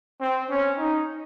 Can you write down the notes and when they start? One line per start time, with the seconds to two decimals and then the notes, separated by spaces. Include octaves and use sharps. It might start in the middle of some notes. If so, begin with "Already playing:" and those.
0.21 C4
0.50 C#4
0.79 D#4